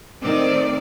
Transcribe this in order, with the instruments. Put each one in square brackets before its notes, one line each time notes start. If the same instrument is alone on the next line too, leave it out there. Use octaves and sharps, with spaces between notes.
[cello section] D#3 A3 C4 D5